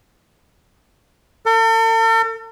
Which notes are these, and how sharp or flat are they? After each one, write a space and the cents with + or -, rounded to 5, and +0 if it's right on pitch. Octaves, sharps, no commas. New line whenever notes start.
A4 +45